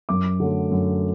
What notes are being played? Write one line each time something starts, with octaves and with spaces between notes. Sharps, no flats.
F#2 D6
D3 F#3 A3
F#2